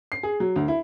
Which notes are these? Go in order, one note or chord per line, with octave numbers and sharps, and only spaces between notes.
C7
G#4
F#3
D2
E4